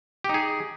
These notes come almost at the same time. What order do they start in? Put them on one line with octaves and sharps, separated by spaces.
G4 D#4 G#4